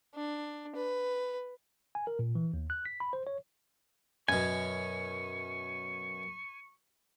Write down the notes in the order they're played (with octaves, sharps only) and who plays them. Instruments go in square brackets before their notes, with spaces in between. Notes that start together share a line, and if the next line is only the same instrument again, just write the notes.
[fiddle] D4
B4
[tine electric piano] G#5
A#4
A#2
E3
D#2
F#6
B6
B5
C5
C#5
[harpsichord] F#2 B2 [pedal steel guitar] G#5 [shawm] C#6